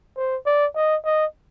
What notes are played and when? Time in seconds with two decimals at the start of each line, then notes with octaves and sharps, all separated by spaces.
0.16 C5
0.46 D5
0.76 D#5
1.05 D#5